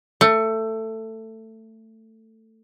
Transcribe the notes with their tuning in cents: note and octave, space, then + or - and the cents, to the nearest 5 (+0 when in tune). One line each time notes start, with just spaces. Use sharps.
A3 +15